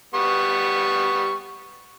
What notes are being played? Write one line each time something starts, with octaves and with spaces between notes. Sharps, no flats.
G3 B3 C#6